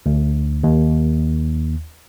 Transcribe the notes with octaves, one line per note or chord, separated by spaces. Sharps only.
D2
D#2